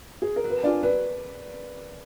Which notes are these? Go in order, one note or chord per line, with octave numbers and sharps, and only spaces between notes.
G#4
A#4
F#3
B4
D4 F4 G#4 D5
F#3 B4